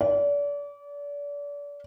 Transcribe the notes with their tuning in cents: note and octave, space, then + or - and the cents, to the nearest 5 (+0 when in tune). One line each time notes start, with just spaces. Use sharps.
D5 -35